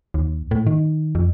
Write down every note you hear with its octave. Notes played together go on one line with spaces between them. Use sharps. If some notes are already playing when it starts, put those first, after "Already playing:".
D#2
A2
D#3
F2